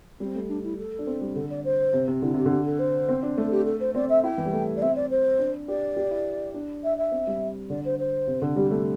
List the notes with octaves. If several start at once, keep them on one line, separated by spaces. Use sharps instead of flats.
G3 C4
A3
D4
E4
A4
D4
C4
G3
D3 A4
D5
C5
C3
C3
D3 E4
C3 G4
D3
G4
A4
C5
C4
D4
A3 A4
G4
A4
C5
C4 D5
E5
E4 G5
E3
G3
A3
D5
C4 E5
D5
C5
D4
G4 D5
G4
E4
D4
E5
E5
C4
G3
D3 D5
C5
C5
C3
D3
G3 G4
A3 D4